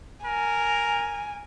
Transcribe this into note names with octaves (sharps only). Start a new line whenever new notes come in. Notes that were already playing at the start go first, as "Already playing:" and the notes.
A#4 G#5